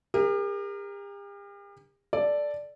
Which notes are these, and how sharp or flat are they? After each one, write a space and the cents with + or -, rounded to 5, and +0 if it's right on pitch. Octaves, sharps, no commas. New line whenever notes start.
G4 +45 A#4 +0
A4 +0 D5 +0